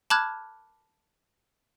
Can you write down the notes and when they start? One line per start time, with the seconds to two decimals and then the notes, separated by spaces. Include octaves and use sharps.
0.10 A5 B5 D6 F6 F#6 G#6